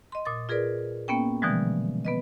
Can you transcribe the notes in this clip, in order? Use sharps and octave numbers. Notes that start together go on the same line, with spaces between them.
D#5 C6
A#2 D#6 A6
F4 G#4 A#4 B4 D5
A#3 B3 C#4 G5
B2 D3 E3 F3 G3 G#3
B3 B4 D#5